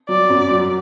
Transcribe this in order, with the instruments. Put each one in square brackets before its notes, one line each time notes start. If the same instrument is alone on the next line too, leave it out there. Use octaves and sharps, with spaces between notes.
[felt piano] F#3 [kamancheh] D5
[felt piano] F#2
F#3